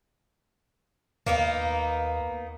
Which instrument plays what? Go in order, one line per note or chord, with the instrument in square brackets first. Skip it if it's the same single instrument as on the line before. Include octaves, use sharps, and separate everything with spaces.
[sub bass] D#2 [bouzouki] A#3 B3 D#4